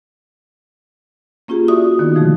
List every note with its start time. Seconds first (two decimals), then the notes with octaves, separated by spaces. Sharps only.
1.48 A#3 C#4 F4 G4 G#4
1.68 E4 F#4 D5 E5 D#6
1.99 D#3 B3 D#4
2.15 B2 D3 D#3 F3 F#3 A3